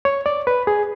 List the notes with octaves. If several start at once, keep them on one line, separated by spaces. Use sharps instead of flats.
C#5
D5
B4
G#4